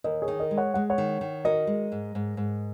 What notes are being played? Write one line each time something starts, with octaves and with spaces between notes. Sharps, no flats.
D#2 A#4 D#5
G#4 C#5
D#3
A#4 D#5
G#3
C#5 F#5
G#3 F#5
C#5 F#5
D#3
D#3
F#4 A#4 D#5
G#3
G#2
G#2
G#2